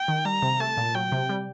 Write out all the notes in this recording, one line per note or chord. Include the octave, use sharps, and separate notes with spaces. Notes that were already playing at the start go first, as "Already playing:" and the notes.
Already playing: G5
D#3
G3 A#5
C3
A3 A5
A#2
F#3 G5
C3
G3